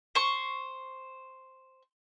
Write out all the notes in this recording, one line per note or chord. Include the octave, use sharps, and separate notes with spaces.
C5 C#6